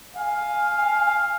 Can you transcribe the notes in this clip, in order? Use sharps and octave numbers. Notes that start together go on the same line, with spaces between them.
F5 G#5